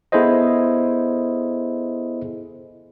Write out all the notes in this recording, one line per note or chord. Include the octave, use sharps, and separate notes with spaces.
B3 E4 G#4 A4 C5 D#5